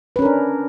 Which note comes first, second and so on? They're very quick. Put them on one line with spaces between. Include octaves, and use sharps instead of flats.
B4 C#4 A#4 D4